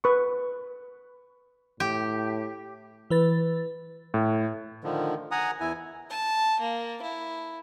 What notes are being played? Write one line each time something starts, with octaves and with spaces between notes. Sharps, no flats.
B4 C#6
A2 G4
E3 B4 A6
A2
D3 D#3 F3
F#5 G#5 A#5 D#6
E2 E4 G#5
A5
A#3
E4